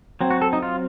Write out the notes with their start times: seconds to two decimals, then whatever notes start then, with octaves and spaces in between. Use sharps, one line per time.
0.21 F#3 C4
0.31 F#4
0.42 A4
0.53 D#4
0.63 F4